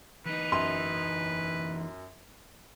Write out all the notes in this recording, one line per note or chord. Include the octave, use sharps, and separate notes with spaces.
E2 D#4 B4
F#2 C6